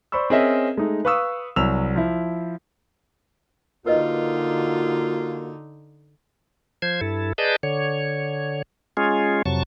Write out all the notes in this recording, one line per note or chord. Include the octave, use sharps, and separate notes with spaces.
C5 D5 B5 C#6 E6
C4 C#4 G#4 A#4 D#5 E5
G#3 A3 D#4
B4 F5 C#6 D#6 E6
C2 F#3 E6 F7
F3 E4
D3 A#3 D#4 F4 F#4 A#4 B4 D#5
F3 C5 G#6
G2 E4 A4
G#4 B4 D5 D#5 A5 G6
D3 C#5
G#3 C#4 F4 G#4
F2 C3 F#3 A5 C#6